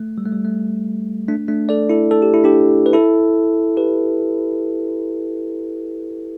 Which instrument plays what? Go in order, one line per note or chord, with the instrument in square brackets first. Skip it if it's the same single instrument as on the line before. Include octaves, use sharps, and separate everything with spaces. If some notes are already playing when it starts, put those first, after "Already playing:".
Already playing: [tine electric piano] A3
G3
A3
G3
A3
A3 D4
A3 D4
A4 D5
E4 A4
A4
G4
E4
D4 G4
B4
E4 A4
G4 B4